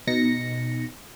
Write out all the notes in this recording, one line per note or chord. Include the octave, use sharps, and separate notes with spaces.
B2 D#4 A#6 C#7